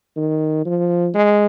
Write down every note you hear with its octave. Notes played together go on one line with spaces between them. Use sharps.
D#3
F3
G#3